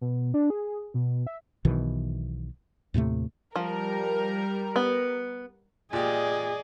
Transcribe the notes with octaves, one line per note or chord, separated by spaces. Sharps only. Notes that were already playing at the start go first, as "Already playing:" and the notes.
B2
D4
G#4
B2
E5
B1 B2 D#3 E3
D#2 A2 C3 A3
F3 G3 A#4
B3
A#2 G4 G#4 D5 D#5